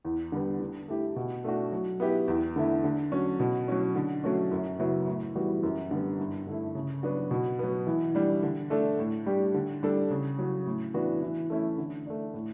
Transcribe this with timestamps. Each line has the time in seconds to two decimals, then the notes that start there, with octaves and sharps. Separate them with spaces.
0.05 E2
0.32 D3 G3 B3
0.60 D3
0.88 A3 E4 G4
1.16 B2
1.44 A3 D4 F#4
1.72 F#3
2.00 B3 E4 G4
2.28 E2
2.56 D3 A3 E4
2.84 D3
3.12 F#3 C#4
3.40 B2
3.68 F#3 C#4
3.95 D3
4.24 F#3 A3 C#4
4.51 F#2
4.79 C#3 F#3 B3 E4
5.08 A2
5.35 E3 G3 B3 F#4
5.63 F#2
5.91 D3 G3 B3
6.20 G2
6.47 D3 A3 E4
6.75 C#3
7.03 F#3 B3 D4 F#4
7.31 B2
7.59 F#3 B3
7.87 E3
8.15 G3 D4
8.43 D3
8.70 A3 D4 A4
8.99 A2
9.26 G3 D4 G4
9.54 D3
9.83 G3 D4 A4
10.11 C#3
10.39 F#3 C#4
10.66 A2
10.94 E3 B3 D4 F#4
11.22 E3
11.50 A3 C#4 E4
11.78 D3
12.06 A3 D4
12.34 A2